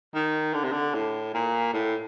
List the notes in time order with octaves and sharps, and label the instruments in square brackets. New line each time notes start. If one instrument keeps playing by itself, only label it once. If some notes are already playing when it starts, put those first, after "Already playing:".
[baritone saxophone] D#3
D3
C3
D3
A2
A#2
A2